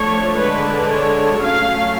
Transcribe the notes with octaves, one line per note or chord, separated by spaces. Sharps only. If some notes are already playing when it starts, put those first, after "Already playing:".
Already playing: F3 A3 D4 C#5
D3 G#3 D4 B4
C#5
F#3 A3 C#4 F5